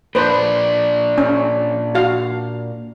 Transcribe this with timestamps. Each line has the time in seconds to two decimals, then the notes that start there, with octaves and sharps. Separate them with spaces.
0.15 A#2 D4 B4 C5
1.18 C#4
1.95 F#4 F5